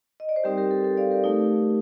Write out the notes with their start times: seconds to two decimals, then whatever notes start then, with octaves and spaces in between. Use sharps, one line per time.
0.20 D#5
0.29 D5
0.36 C5
0.44 G3 C4 D#4 G4 A#4
0.57 G4 A#4
0.71 A4
0.84 A4
0.97 D5 F5
1.11 G4 A#4
1.24 A3 D#4